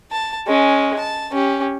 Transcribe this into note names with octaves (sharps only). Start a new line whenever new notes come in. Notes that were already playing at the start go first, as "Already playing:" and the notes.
A5
G#3 C#4
A5
C#4 G4